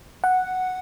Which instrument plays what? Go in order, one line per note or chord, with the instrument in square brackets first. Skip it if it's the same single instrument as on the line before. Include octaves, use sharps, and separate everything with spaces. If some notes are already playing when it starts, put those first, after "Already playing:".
[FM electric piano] F#5